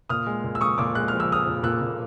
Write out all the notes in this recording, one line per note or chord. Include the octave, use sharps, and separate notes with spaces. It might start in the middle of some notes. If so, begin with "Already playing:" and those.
A#2 D#6 F6
G#3
A#2
E6
G#3 C#6 D#6
A#2 D6 E6
G#3 F#6
F3 F6
E6
G#3 D#6 F6
A#2
A#2 E6 F#6
A#2